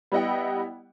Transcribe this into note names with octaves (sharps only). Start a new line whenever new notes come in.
G3 B3 E4 D#5 F#5 G5